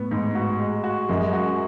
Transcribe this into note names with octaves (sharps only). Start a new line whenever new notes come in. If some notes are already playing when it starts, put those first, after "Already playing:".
Already playing: A2 B3
G#2
F#4
G#3
F#4
F#2 G#3
F#4